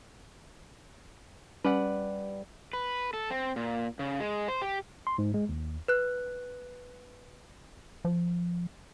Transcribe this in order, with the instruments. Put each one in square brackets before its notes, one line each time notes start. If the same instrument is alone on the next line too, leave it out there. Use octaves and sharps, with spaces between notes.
[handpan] G3 [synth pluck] C#4 [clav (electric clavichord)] B4 D5 F#5
[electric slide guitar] B4
A4
C4
A#2
C#3
G#3
C5
G4
[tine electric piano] C6
G#2
G#3
D#2
[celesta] B4 F#6
[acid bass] F3